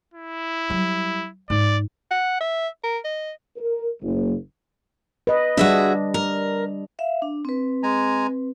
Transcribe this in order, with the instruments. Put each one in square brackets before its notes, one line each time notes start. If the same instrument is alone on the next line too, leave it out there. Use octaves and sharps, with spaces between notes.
[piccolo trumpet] E4
[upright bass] F#3 G3
[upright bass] G#2 [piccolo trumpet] D5
[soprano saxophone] F#5
E5
A#4
D#5
[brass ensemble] A#4
F#1
[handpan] B4 D#5
[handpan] G3 D4 [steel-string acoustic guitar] F#4 G#4 E5
[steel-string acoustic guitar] A#4
[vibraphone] E5 F5
D4
C4 B4
[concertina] G#3 G#5 A#5